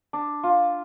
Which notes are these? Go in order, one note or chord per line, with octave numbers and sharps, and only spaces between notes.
D4
F4